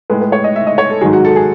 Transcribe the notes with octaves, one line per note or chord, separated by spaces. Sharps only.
A2 G#3 B4
B4
C#5
D#5
E5
D#5
C#5
A4
G#2 D#3 F#3 G#4
F#4
A4
G#4